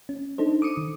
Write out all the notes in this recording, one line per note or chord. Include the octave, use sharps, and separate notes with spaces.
C#4
D4 D#4 A4 C5
D6 D#6 C#7 D#7
D#3